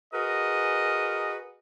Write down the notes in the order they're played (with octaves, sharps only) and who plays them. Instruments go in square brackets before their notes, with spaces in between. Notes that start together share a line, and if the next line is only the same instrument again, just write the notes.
[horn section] F#4 G#4 A#4 B4 D#5